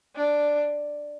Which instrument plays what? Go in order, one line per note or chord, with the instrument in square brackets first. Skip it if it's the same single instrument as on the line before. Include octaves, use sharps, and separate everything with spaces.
[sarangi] D4